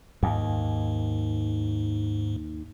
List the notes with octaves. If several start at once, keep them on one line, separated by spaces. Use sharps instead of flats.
D#2 G#2